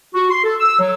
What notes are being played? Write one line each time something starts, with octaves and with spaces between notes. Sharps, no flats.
F#4
C6
A4
E6
F#3